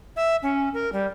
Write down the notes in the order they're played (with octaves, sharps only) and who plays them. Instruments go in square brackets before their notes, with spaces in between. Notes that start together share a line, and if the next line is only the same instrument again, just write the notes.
[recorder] E5
C#4
A#4
G3